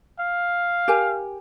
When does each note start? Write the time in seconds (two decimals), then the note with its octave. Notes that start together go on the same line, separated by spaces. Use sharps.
0.19 F5
0.88 G4 A#4 G#5